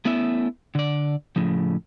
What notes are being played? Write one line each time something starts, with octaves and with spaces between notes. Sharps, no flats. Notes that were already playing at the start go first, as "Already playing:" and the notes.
A3 B3 C#4 E4 E5
D3 D5
A2 C#3 F3